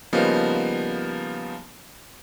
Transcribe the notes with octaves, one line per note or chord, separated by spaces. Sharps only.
C#3 F3 G3 A#3 B3 D#4